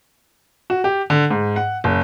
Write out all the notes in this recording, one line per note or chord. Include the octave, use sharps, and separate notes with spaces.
F#4
G4
D3
G#2
F#5
F#1